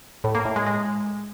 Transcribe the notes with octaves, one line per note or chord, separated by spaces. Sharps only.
A2
A#3
A2
G#3
G#3